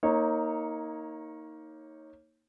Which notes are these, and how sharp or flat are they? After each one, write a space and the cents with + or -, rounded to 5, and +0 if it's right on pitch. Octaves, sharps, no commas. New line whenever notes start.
A#3 -5 D#4 +15 C#5 -20